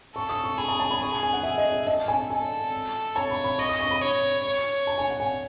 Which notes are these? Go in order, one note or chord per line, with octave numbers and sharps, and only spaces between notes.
A4 C#6
D#6
C#6
G#4 B5
A5
A5
B5
G#4 C#6
A5
G#5
F#5
G#4 E5
D#5
E5
A4 D#5
G#5
A4 G#5
C#5 A5
B5
B5
D#5 C#6
D#6
C#6
B5
C#5
C#5
A5
G#5
F#5
G#5